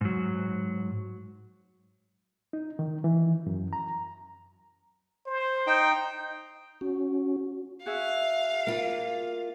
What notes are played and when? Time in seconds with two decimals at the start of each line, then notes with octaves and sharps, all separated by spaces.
0.01 G#2 F#3
2.53 D#4
2.79 D#3
3.04 E3
3.47 F#2
3.73 A#5
5.27 C5
5.67 D#4 G5
6.81 C#4 F#4
7.86 F#4 G#4 E5 F5
8.67 A#3 F4